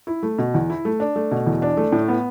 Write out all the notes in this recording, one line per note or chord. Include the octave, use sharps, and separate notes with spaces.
E4
A3
B2
E2
E4
A3
D4
A3
B2
E2
D4
A3
A2
B3